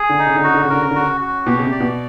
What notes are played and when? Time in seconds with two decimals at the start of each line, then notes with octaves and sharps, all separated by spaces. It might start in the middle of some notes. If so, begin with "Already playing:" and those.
Already playing: G#4
0.09 D3
0.19 D#4
0.27 C#3
0.36 D3
0.44 C#3 F#4
0.54 D3
0.64 C#3
0.70 D3 A#4
0.82 C#3
0.91 D3
0.95 C#3 F#4
1.21 F#4
1.46 B2 G4
1.58 C#3
1.63 C3
1.72 D5
1.80 B2